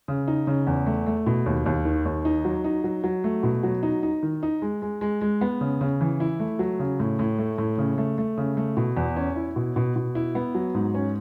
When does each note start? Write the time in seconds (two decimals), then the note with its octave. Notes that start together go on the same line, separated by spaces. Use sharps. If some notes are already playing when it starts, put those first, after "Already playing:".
0.08 C#3
0.28 D#4
0.47 C#3
0.67 E2
0.86 A3
1.07 A3
1.26 B2
1.46 D#2
1.66 D#2
1.85 D#3
2.05 D#2
2.25 D#4
2.45 F#3
2.64 D#4
2.84 F#3
3.04 F#3
3.24 A3
3.43 B2
3.63 F#3
3.83 D#4
4.03 D#4
4.23 D#3
4.43 D#4
4.62 G#3
4.82 G#3
5.01 G#3
5.21 G#3
5.41 B3
5.61 C#3
5.81 C#3
6.01 E3
6.20 E4
6.40 A3
6.59 F#3
6.79 C#3
7.00 A2
7.19 A2
7.39 A3
7.58 A2
7.78 C#3
7.98 A3
8.18 A3
8.38 C#3
8.57 A3
8.77 B2
8.97 E2
9.16 C#4
9.36 E4
9.56 B2
9.76 B2
9.96 B2
10.15 E4
10.35 B3
10.55 F#3
10.74 G#2
10.94 C#4